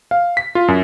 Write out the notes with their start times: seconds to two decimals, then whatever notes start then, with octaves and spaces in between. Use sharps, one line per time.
0.11 F5
0.37 B6
0.55 F4
0.68 F#2